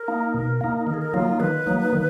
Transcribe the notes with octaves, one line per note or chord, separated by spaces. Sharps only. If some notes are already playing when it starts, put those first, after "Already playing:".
Already playing: A#4
A#3 D#4
B2
A#3 D#4
D#3 A#4
G#4
A#4
F#3 A#3 D#4 F4
D#3 B4
F#3 A#3 D#4
D#3